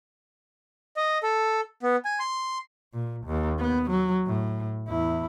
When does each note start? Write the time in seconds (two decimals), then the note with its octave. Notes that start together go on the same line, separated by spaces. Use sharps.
0.97 D#5
1.23 A4
1.82 B3
2.05 G#5
2.19 C6
2.93 A#2
3.26 D#2
3.59 B3
3.90 F#3
4.26 A2
4.88 E2 E4